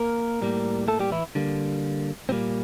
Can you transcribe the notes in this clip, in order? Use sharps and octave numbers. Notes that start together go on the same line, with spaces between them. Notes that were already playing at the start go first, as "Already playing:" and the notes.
Already playing: A#3 A#4
A2 G3 A#3
A3 A4
G3 G4
E3 E4
D3 G3 A#3
A#2 G3 A#3 C4